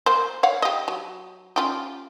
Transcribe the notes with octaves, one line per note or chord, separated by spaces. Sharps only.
A#3 C5
C#5 F5 F#5
G4 D#5
F#3
C#4 F4 G4